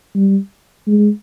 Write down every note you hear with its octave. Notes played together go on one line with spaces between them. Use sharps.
G3
G#3